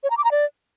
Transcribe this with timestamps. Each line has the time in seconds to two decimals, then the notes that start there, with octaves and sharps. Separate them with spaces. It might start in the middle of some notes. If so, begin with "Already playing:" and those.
0.03 C#5
0.10 A#5
0.17 D6
0.24 A#5
0.31 D5